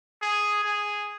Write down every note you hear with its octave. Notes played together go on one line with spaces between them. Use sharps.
G#4
G#4